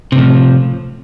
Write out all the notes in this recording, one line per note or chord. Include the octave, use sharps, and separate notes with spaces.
A2 C3 F3